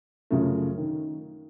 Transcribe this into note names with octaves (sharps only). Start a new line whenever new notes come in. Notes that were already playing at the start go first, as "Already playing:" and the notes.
F#2 C#3 F3 A3
D#3